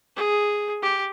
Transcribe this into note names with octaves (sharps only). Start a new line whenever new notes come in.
G#4
G4